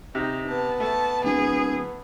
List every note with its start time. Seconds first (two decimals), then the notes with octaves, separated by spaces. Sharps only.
0.15 C3 D#4
0.48 B3 A5
0.80 A3 A5
1.24 D1 G#4